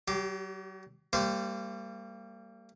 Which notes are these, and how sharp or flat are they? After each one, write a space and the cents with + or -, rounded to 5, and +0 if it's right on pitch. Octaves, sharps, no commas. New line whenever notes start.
F#3 +40 G4 -5
G3 +5 A#3 -35 C5 -25